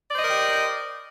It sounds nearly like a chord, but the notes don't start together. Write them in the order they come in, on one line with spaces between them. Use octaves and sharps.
D5 C5 D#5 A#4 G4